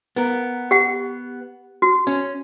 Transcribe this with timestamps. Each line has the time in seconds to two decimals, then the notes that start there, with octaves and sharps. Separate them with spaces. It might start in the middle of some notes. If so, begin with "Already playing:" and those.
0.16 B3 A#4
0.71 G4 F#5
1.82 F#4
2.07 C#4